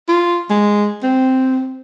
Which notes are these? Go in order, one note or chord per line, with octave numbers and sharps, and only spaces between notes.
F4
G#3
C4